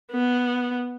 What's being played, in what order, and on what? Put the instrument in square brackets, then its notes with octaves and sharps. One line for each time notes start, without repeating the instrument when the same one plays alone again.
[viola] B3